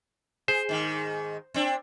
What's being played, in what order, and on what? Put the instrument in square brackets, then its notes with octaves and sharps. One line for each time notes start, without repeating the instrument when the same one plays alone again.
[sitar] G#4 [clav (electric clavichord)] C5
[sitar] G#2 D#3
C4 D4